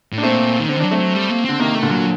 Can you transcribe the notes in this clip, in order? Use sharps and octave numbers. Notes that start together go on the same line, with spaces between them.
A2
D4
A#2 A3 C4
D#3
D3 C4
D#3
F#3 D4
A3 C4
F#3
G3
A#3
D3 C4
C3 D#3 A#3
A3
A#2 D3
F#3